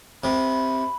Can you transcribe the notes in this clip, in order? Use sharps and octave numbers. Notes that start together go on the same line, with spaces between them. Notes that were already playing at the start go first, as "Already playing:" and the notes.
C3 B5